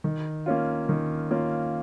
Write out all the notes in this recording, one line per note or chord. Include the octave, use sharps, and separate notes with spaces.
D#3
A#3 C#4 F4
D#3
A#3 C#4 F4